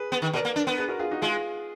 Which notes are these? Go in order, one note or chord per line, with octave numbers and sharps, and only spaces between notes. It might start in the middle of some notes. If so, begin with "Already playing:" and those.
Already playing: G#4 B4
B3
D#3
B2 A#4 D5
A#3
D4
B3
G#4 B4
F#4 A#4
F4 G#4
D#4 F#4
G#3 F4 G#4